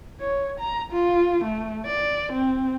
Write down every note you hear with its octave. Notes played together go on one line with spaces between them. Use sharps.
C#5
A#5
F4
A3
D5
C4